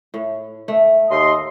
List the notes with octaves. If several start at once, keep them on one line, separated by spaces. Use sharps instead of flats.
A2
A3
D#2 D#5 C6